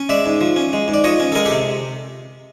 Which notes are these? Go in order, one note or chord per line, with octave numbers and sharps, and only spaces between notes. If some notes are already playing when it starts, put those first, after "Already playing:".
Already playing: C#4
G#3 D5 E5
G#2
F3
C#4
G#3
G#2
D5
F3 C#5 D#5
C#4
A4
G#3 G#4 A#4
G4 A4
C3